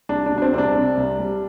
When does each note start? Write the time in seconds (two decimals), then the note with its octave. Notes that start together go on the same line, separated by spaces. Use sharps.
0.09 C2 D4
0.26 D4
0.31 B2
0.38 D4
0.42 C4
0.53 C2 C4
0.58 D4
0.76 C3
0.97 C2
1.19 G3